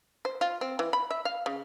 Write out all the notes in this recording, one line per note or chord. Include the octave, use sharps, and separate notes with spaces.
C5
F4
C4
E3
B5
E5
F5
C#3